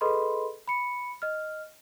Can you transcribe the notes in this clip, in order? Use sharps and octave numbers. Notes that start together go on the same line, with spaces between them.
G#4 A4 B4 D#5 B5 C6
B5 C#7
D#5 F6